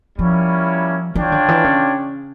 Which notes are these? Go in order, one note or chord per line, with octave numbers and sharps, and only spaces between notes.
F3 G3 A#3 C#4 E4
E3 D4 F4 C#5 G5
D3
E3
C#3